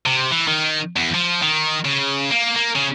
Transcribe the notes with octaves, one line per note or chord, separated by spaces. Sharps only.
C3
E3
D#3
E2
F3
D#3
C#3
A#3
A#3
C#3